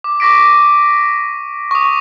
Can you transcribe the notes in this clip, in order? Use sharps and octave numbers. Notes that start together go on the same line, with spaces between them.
D6
C#6 D6 A#6 B6 D7
C#6 D#6